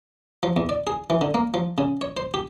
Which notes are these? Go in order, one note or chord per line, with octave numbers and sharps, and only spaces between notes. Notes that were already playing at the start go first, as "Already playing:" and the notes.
F3
E2
D5
G#4
E3
D3
A#3
F3
C#3
C#5
C5
G4